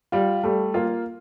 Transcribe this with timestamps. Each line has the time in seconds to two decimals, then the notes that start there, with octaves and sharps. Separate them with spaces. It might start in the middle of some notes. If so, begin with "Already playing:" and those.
0.12 G3 F4
0.44 G3 A3
0.74 A#3 F4